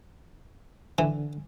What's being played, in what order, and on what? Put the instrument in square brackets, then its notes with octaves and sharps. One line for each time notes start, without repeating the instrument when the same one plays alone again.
[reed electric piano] D3 [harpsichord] E3